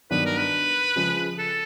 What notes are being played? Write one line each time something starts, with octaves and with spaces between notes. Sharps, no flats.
G2 D#3 F#3 B3 D4 B4
A#4
B4
C#3 F3 G#3
A4